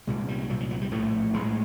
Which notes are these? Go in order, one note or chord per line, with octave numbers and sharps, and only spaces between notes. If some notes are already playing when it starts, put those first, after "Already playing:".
C2 A#2 G#3
G3
C2 A#2 F#3
F3
F#3
G3
A#1 A2 A3
A#1 A2 G#3